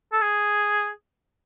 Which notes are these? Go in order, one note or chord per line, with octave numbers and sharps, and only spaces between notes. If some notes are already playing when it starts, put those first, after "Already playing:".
A4
G#4